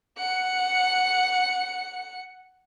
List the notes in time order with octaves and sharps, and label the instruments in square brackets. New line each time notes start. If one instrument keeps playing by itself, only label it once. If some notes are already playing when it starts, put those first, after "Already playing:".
[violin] F#5 C#7